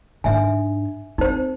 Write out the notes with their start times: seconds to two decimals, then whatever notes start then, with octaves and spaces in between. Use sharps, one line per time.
0.24 G#2 D4 E5 G#5
1.18 C4 D#4 C5